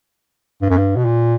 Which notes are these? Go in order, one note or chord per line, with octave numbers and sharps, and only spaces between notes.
G2
F#2
G2
B2
A#2